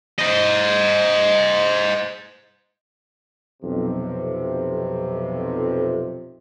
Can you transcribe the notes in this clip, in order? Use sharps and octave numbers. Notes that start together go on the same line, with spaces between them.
C5 D#5
B1 F2 C3